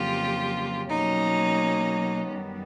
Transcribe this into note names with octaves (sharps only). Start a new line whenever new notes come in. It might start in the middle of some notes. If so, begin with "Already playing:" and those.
Already playing: F2 C#3 F#3 A#3 F4 G4
B2 F#3 A#3 C#4 D#4
F#2 D#3 G3 B3